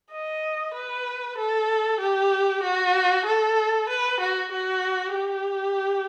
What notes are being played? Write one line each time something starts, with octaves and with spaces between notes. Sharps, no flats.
D#5
B4
A4
G4
F#4
A4
B4
F#4
F#4
G4